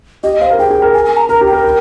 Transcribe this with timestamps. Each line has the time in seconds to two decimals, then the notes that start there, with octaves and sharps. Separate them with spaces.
0.24 G4 D#5
0.40 C5 F5
0.50 A#4
0.59 G#4 G5
0.70 G#4
0.82 A#4
0.94 G#5
1.05 G#5
1.17 A#5
1.29 A#4 A#5
1.41 G4
1.47 G5
1.53 A#4
1.64 A#4